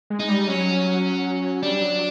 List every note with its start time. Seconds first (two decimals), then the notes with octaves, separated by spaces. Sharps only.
0.10 G#3
0.20 D#4
0.29 G3
0.48 F#3 C#4
1.62 G3 D4
1.82 F#3